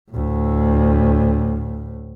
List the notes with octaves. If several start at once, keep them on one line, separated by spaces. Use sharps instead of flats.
D2 A2